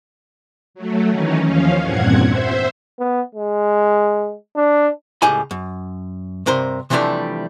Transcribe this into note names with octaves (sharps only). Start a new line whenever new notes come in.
F#3 A3
D#3 E3 C#4 D#4
D#2 F3 C#4 F5
E2 G2 A#2 C4 F#5 G#6
C5 E5
B3
G#3
D4
C#2 A2 G4 D#5 G#5 B5
F#2
G2 C3 A#4 C5 C6
C3 E3 F3 G3 A3 D4